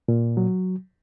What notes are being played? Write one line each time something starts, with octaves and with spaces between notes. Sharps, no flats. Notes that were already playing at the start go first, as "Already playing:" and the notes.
A#2
F#3